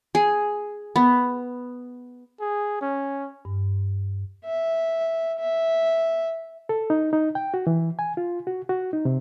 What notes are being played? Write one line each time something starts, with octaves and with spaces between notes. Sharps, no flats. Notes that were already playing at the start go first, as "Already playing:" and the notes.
G#4
B3
G#4
C#4
G2
E5
E5
A4
D#4
D#4
G5
F#4
E3
G#5
F4
F#4
F#4
D#4
C3